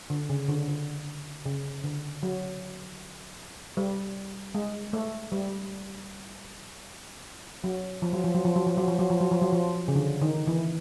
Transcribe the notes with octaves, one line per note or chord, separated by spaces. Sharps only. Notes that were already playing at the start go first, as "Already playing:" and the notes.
D3
C#3
D3
D3
C#3
D3
F#3
G3
G#3
A3
G3
F#3
F3
F#3
F3
F#3
F3
F#3
F3
F#3
F3
F#3
F3
F#3
F3
F#3
F3
C#3
D3
D#3
E3